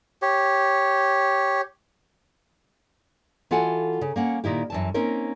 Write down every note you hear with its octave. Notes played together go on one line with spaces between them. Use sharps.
G4 C#5
E3 F4 F#4 A4 F#5 G#5
C#3
A#3 C#4 F#5
A#2 D#3 E4 G4
F#2 E3 A5
A#3 C4 C#4 D#4 A#4